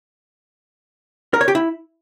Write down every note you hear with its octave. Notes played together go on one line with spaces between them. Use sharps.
A#4
C#5
G4
E4